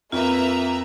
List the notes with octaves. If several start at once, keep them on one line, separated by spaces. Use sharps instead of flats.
F2 A#3 F4 B4 E5 A#5